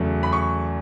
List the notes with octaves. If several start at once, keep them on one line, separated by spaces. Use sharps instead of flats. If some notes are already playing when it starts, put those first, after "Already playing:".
Already playing: E2 C#3 F#3 A3
B5
C#6